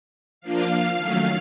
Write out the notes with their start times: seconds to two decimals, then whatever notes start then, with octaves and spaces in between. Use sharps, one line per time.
0.41 F3 A#3 D4 F4 F5
0.96 D#3 F#3 A3 C#4